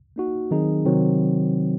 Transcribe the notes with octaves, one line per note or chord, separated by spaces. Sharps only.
A#3 D#4 F#4
D#3 F#3 C4 D#4 G#4
C3 D#3 F#3 C4